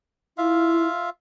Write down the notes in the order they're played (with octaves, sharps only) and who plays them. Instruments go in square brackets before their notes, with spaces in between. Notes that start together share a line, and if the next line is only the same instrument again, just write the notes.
[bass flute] E4 [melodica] F4 E5 F5